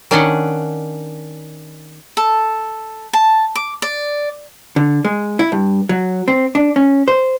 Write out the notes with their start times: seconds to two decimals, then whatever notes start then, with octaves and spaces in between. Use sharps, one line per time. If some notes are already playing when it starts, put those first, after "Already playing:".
0.11 D#3 C#4 D4 D5 D#5 F#5
2.17 A4
3.13 A5
3.55 D6
3.82 D5
4.76 D3
5.05 G#3
5.39 E4
5.52 G2
5.89 F#3
6.28 C4
6.55 D4
6.76 C#4
7.08 C5